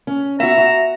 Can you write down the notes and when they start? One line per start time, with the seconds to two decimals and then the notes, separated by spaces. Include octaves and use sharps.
0.07 C#4
0.40 B3 F#4 E5 A#5
0.58 F#4